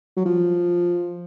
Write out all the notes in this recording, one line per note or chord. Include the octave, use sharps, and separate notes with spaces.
F#3
F3